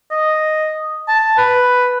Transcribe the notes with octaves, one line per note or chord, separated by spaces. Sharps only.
D#5
A5
B4